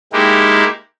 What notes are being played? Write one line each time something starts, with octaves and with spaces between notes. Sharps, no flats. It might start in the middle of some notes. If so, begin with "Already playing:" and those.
G#3 A#3 D#4 E4 G4